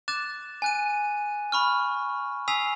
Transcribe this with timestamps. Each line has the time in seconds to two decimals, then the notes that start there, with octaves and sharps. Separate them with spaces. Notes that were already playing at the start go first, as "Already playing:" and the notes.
0.08 D6 F#6 A6 E7
0.62 G#5 F#6 D#7
1.52 B5 C#6 F6
2.48 G#5 D#6 E6 B6 C7 F7